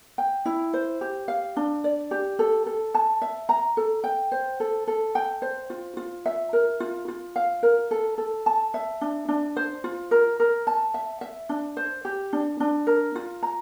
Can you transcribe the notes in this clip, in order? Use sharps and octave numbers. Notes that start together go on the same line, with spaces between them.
G5
E4
C5
G4
F5
D4
D5
G4
A4
A4
A5
E5
A#5
A4
G5
C5
A4
A4
G5
C5
F4
F4
E5
A#4
F4
F4
F5
A#4
A4
A4
A5
E5
D4
D4
C5
F4
A#4
A#4
A5
E5
E5
D4
C5
G4
D4
D4
A#4
F4
A#5